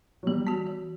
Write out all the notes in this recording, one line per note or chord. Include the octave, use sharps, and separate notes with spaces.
F#3
E3 G3
B3 F#4
E3